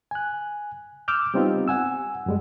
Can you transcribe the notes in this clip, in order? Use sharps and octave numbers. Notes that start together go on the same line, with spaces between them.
G#5 F#6
D6 E6 F6 G6
G3 B3 C4 D#4 F4 G4
F#5 G#5 E6
F#2 G3 G#3